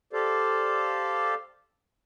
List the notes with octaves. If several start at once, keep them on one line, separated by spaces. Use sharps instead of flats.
G4 A4 C5 D5 F5